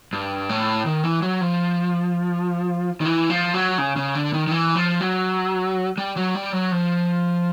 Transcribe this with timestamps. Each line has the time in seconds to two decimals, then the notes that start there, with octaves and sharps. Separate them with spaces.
0.13 G2
0.49 A2
0.86 D#3
1.04 E3
1.22 F#3
1.41 F3
3.01 D#3
3.05 E3
3.30 F3
3.54 F#3
3.78 C#3
3.96 C#3
4.15 D3
4.33 D#3
4.47 D#3
4.51 E3
4.76 F3
5.01 F#3
5.98 G3
6.16 F#3
6.35 G3
6.52 F#3
6.72 F3